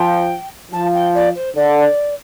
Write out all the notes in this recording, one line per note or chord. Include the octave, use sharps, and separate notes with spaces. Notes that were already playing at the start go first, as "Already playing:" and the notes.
Already playing: F3 G5
F3 A5
G5
D5
C5
D3 D5